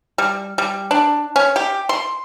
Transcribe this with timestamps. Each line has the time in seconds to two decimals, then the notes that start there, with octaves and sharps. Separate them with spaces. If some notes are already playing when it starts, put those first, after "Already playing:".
0.18 G3
0.58 G3
0.91 D4
1.36 C#4
1.56 G4
1.89 C6